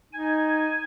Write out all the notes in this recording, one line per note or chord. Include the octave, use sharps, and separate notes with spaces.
D#4 G#5